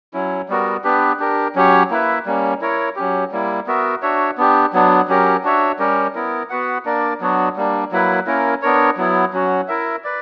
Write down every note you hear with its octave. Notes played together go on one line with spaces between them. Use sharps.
F#3 C#4 E4
G3 B3 F#4 A#4
B3 D4 G4 B4
D4 G4 A#4
F#3 C#4 G4 C#5
A#3 E4 B4 E5
G3 A#3 C#4
E4 A#4 C#5
F#3 C#4 G4
G3 A#3 E4
B3 F#4 A#4 E5
D4 F#4 C#5 E5
B3 D4 G4
F#3 B3 D4
F#3 C#4 G4 A#4
D4 F#4 C#5 E5
G3 C#4 G4 A#4
B3 E4 A#4
B3 F#4 B4 F#5
A#3 D4 A#4 D5
F#3 B3 D4 F#4
G3 A#3 D4
F#3 A#3 E4 B4
A#3 C#4 E4 A#4
B3 D4 A#4 C#5
F#3 B3 E4
F#3 C#4 F#4
E4 A#4 E5
B4 D5